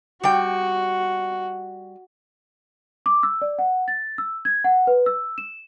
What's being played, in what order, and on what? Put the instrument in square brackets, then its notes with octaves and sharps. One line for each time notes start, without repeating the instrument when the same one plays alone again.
[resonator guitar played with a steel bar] G3 G5 [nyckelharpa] F#4
[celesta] D6
E6
D5
F#5
A6
E6
G#6
F#5
B4
E6
E7